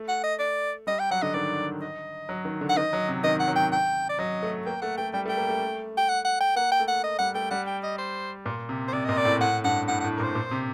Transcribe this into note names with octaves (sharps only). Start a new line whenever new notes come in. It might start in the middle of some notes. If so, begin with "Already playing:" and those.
Already playing: A3
F#5
D#5
D5
G3 D#5
G5
F#3 F#5
D3 D#5
D#3 D5
D#5
F#3
D#3
D3
F#5
D#3 D#5
F#3
C3
D#3 D#5
F#5
F#3
G5
G5
D5
F#3 D#5
A3
A#3 G5
A3 F#5
A3 G5
G3 G5
A3
G5
A#3
A3
G5
F#5
F#5
G5
A#3 F#5
G5
A3
F#5
D#5
G3 F#5
A3 G5
G3 F#5
G5
D#5
C5
A#2
C3
C5
C3 D5
A#2 D#5
D5
A2
A2 F#5
G2 F#5
A2 F#5
F#5
A2
A#4
A#2
C5
A#2
C3